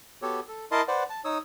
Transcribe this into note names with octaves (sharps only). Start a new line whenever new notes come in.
B3 F#4 G4 A4 C#5
A4
E4 A#4 D#5 A5 C6
B4 C5 D5 F#5
A5
D#4 C#5 D#6 E6